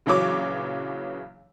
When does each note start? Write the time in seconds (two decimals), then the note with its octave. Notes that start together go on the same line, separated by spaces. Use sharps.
0.06 A#1 C#3 E3 F#3 C#5 D6